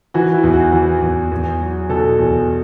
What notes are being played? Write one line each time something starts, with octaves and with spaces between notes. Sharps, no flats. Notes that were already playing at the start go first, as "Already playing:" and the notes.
E3 F#4
E4
E2
F#4
E3
E2
E2
F#3
B2 A4
E2